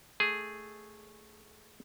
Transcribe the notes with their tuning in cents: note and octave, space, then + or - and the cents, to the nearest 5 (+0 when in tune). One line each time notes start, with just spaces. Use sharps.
A3 +0 G#4 +0